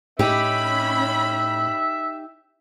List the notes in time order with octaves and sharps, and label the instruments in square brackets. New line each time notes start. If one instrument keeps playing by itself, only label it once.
[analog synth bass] A2 [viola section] C#4 B5 [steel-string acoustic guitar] D#4 G4 [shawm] E5